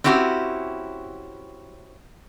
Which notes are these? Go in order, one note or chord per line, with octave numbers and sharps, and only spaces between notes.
C4 C#4 E4 F#4 G4